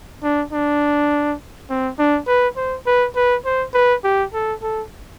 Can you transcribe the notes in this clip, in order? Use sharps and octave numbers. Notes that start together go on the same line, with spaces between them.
D4
D4
C4
D4
B4
C5
B4
B4
C5
B4
G4
A4
A4